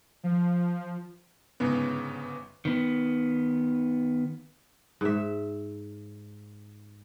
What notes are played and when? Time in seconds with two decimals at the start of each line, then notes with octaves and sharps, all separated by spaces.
0.24 F3
1.60 G1 G#2 C#3 B3
2.65 D#3 B3
5.01 G#2 E5